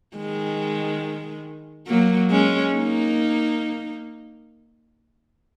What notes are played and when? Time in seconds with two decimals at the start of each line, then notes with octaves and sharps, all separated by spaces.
0.16 D#3 G#3
1.87 F#3 A#3
2.30 G#3 C#4
2.73 A#3 D#4